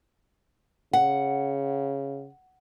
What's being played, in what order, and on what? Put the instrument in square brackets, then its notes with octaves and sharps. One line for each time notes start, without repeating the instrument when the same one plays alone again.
[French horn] C#3 [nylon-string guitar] F#5